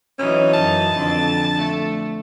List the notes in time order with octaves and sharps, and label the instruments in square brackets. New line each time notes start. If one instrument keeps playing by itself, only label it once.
[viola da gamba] E3 F#3 D#4 [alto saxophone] C#4
[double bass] F#2 [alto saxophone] A5
[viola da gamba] F2 [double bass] D3 F3
[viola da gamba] A3